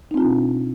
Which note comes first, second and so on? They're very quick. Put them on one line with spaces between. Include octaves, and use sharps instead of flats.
D#4 C4 F4 D4 B2